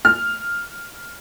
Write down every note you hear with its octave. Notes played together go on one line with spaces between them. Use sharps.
F6